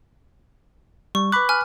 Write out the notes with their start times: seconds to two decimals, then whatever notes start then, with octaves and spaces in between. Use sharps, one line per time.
1.15 G3 C#6
1.32 B4 B5 D6 F#6
1.49 G#5 F6